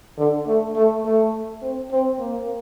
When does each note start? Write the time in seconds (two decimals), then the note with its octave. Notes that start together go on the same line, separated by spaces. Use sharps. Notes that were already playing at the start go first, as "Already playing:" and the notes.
0.18 D3
0.47 A3
0.75 A3
1.05 A3
1.62 C4
1.91 C4
2.19 A#3